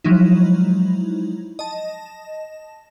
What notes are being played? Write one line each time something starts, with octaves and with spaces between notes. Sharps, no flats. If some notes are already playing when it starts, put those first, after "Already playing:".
F3 F#3 G#3 D#4 E4
D#5 A5